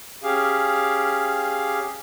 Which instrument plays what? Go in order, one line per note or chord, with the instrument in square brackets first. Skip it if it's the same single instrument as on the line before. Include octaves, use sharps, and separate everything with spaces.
[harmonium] C#4 G4 G#4 F5